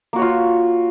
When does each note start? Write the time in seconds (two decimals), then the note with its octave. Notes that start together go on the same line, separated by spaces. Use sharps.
0.13 A#3
0.16 F#4
0.19 C#5
0.22 F4